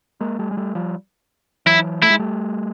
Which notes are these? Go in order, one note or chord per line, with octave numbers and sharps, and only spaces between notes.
G#3 A#3
G3 A3
G#3
G3 A3
F3 G3
E3 F#3 E4
A3 E4
G#3
G3 A3